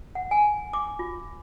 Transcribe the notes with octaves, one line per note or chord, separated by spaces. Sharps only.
F#5
G#5
D6
F4